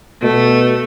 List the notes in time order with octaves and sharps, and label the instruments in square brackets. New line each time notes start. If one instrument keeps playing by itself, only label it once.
[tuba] B2 [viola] A3